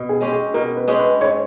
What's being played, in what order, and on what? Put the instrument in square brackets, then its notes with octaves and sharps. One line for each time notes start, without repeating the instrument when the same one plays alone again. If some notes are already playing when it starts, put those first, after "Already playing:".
Already playing: [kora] B2
[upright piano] G#4
[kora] G#3 C#4 G4
[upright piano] G#4
[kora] B2 [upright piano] A#4
[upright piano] B4
[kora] G#3 C#4 G4
[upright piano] B4
[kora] G#2 [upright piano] C#5